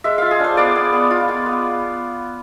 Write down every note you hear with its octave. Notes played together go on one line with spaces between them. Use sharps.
G#3 E5
F4 F5
G#4
D4 C5
B3 D5
B3
B3
F4
B3
B3